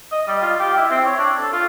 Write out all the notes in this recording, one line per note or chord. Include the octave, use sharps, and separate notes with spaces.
D#5
G3
F4
G4
E4
C4
C#5
D4
A4
F4